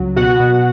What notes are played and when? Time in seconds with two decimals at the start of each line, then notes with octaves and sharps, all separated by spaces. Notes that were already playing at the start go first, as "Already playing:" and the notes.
Already playing: C#2 F#3
0.16 B2 F#4 F#5
0.39 B2